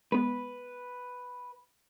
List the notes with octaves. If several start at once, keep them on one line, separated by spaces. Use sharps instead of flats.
G#3 B3 B4